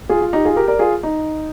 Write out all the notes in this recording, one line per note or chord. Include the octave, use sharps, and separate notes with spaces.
F4 G#4
F4
D#4 G4
F4 G#4
G4 A#4
A#4 D5
F4 G#4
D#4